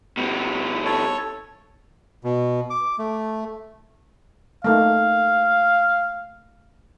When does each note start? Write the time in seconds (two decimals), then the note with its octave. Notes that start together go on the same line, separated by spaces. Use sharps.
0.17 B2 G3
0.85 A4 C#5
2.24 B2
2.70 D6
2.99 A3
4.64 A3 A#3 D#4 F5